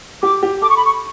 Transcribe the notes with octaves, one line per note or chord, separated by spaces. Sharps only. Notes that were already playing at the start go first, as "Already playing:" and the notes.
G4 D6
G4
A4 D6
C#6
B5
C#6